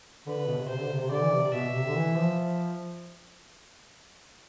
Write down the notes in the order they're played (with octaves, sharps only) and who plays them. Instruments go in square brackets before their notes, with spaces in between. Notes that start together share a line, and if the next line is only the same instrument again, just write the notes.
[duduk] D3 [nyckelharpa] B4
[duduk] D3
B2
C3
[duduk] C3 [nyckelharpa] C5
[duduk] D3
C3
C3
[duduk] D3 [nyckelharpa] D5
[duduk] E3
C3
[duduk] B2 [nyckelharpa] E5
[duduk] C3
D3
E3
F3